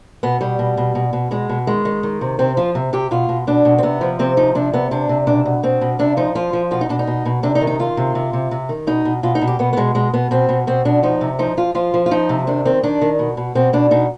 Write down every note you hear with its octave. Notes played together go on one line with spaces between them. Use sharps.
B2 B3
B2 G3
B2
B2
B2
B2
B2 G#3
B2
D#3 G#3
D#3
D#3
C3
C3 C4
F3 F4
C3
C3 G4
B2 F4
B2
B2 D4
B2
C4
C3 B3
F3
C3 C4
F3 D#4
C3 D4
C3 B3
C3 D4
C3
B2 D4
B2
B2 C4
B2
C3 D4
F3 D#4
F3 F4
F3
B2 F4
D#4
B2 D4
D#4
B2
B2
C3 D4
D#4
D#3
D#4
D#3 F4
C3
C3
C3
C3
D#3
B2 D#4
B2
B2 F4
D#4
B2
G4
B2 B3
B3
B2 G#3
B2 G#3
B2 B3
B2 C4
B2
B2 C4
B2 D4
F3 D#4
C3
F3 D#4
F3 F4
F3 F4
F3
F4
F3 D#4
C3
D#3 D4
D#3 C4
D#3 D4
D#3
B2
B2
B2 C4
B2 D4
B2 D#4